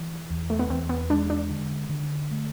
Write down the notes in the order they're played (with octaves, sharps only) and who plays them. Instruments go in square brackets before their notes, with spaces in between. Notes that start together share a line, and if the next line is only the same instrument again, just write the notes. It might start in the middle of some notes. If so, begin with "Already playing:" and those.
Already playing: [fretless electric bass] E3
E2
[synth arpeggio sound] A3
B3
[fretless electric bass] E2 [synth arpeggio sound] C4
[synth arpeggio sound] B3
[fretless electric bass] G#3 [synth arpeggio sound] D4
[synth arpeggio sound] D4
[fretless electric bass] D3
D3
A3